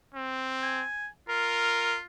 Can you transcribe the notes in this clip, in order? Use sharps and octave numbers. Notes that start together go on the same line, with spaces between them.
C4
G#5
F4 A#4